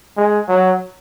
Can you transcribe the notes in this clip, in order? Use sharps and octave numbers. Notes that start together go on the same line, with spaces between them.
G#3
F#3